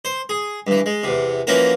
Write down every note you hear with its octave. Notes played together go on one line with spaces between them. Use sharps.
C5
G#4
G2 E3
G#3
E2 C3
E3 F3 A#3 C#4 F#4 A#4